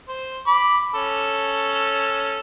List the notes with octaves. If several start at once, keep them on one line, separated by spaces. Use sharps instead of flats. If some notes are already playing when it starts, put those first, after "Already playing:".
C5
B5 D6
C#4 A4